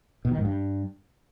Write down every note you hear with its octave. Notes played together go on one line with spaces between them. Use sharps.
B2
D#3
G#2
G2